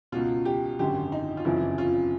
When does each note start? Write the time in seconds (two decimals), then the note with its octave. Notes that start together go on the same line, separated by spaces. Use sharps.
0.12 C#2 B2 F4
0.45 G4
0.79 G#1 F#2 D3 G4
1.12 D#4
1.37 F4
1.45 F#1 F2 C#3 E3 E4
1.78 F4